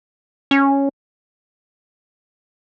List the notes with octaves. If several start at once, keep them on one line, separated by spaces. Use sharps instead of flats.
C#4